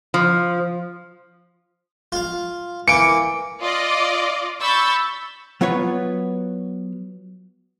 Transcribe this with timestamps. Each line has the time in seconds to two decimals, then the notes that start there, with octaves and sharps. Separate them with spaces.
0.14 F3
2.12 F4 F5
2.88 E3 A#3 C#7 D7
3.60 F4 D5 D#5
4.60 B5 C#6 E6 G6 A6
5.61 F#3 B3 F4 B4 C#5